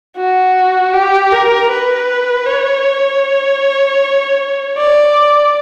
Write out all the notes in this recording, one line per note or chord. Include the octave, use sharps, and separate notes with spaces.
F#4
G4
A#4
B4
C#5
D5